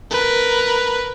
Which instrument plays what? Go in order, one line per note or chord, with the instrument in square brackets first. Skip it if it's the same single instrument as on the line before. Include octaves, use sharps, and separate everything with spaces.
[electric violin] A#4 B4